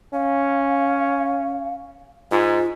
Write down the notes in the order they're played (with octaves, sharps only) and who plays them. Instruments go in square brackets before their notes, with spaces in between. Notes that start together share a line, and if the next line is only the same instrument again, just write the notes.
[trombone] C#4 [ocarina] F5
[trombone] G#2 [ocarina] F4